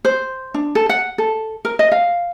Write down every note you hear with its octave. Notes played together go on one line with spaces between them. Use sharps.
C5
D4
A4
F#5
A4
A#4
D#5
F5